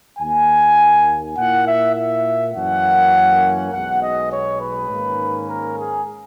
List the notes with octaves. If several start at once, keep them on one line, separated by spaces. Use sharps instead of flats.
D#2 D#3 A#3 G#5
A#2 A#3 E4 F#5
E5
E5
F#2 E3 A#3 C#4 F#5
B1 B2 G#3 F#5
D#5
C#5
B4
G#2 D#3 A#3 C#4
A#4
G#4